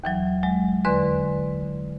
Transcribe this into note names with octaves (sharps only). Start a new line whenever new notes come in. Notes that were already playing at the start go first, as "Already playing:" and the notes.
D#2 E3 F#3
F#3 G#3
E2 D3 B4 D5 C6